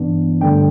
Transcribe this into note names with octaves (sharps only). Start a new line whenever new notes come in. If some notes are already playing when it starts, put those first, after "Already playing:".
Already playing: G2 E3 B3 D4
G2 D3 A3 D4 G5